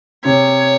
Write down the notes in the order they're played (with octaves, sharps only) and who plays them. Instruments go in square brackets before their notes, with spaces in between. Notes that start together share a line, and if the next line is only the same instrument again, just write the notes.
[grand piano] C3 [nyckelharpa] C#5